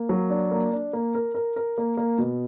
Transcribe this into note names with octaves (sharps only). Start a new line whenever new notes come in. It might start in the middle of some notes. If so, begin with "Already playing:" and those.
Already playing: A#3
F#3
D4
A#3
D4
A#3
A#4
A#4
A#4
A#3
A#3
B2